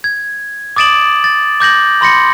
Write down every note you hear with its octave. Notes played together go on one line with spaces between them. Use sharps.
G#6
D6 D#6 A6 D7 E7 F#7
A6
D6 G6 A#6 F#7
B5 C6 A#6 C#7